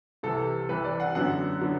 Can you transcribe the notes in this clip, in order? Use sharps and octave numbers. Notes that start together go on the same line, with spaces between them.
C2 C3 E3 A4
C2 C3 E3 B4
D5
F#5
F#2 D3 F#3 B3 F#5
D3 F#3 B3